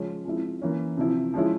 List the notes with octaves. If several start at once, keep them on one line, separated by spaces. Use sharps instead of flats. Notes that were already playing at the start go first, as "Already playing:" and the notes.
Already playing: C#3 F3 G#3 C#4
F3 G#3 C4 E4
E3 A#3 C#4
C3 F3 C4 E4
F3 G#3 C#4 E4